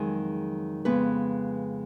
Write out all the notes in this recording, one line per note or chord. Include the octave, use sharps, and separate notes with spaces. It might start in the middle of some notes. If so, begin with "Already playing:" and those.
Already playing: F2 D#3 F#3 G#3 G#4
F2 C#3 G#3 B3 B4